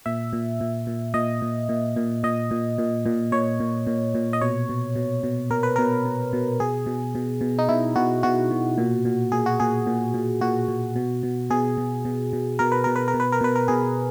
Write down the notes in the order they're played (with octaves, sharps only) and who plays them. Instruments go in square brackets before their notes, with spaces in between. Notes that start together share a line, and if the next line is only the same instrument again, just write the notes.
[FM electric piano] A#2 E5
A#2
A#2
A#2
A#2 D#5
A#2
A#2
A#2
A#2 D#5
A#2
A#2
A#2
A#2 C#5
A#2
A#2
A#2
D#5
B2 C#5
B2
B2
B2
B2 A#4
B4
B2 A#4
B2
B2
B2 G#4
B2
B2
B2
D#4
B2 E4
B2 F#4
B2 F#4
B2
A#2
A#2
A#2 G#4
F#4
A#2 G#4
A#2
A#2
A#2 F#4
A#2
B2
B2
B2 G#4
B2
B2
B2
B2 A#4
B4
B2 A#4
B4
A#4
B2
B4
A#4
B2 B4
A#4
B2 G#4